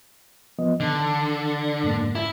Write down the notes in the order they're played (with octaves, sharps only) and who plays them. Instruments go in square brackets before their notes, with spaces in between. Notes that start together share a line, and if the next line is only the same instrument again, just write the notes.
[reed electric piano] F3 B3 D#5
[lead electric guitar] D3 [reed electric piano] D#3
[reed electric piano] F2 G#2 A#3
[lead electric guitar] E4